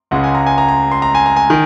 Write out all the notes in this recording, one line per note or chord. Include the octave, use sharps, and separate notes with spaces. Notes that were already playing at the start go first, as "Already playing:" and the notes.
C#2 C#3 G#3 F#5
G#5
A#5
G#5
A#5
A#5
C6
A#5
G#5
A#5
G#5
D#3